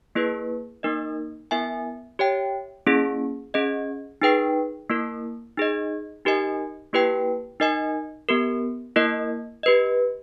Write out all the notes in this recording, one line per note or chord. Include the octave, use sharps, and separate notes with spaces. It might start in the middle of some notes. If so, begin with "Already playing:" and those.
A#3 E4 G#4 B4
A#3 D#4 A#4 D#5
B3 E4 A#4 E5 G#5
G4 C#5 E5 G5
A#3 C#4 E4 G#4
C#4 G#4 D#5
D#4 G#4 B4 G5
A#3 E4 A#4
D#4 G#4 D#5
D#4 G4 A#4 D#5 G#5
A#3 E4 G4 B4 G5
D#4 A#4 D#5 G#5
B3 G4 A#4
A#3 E4 A#4 D#5
G4 B4 D#5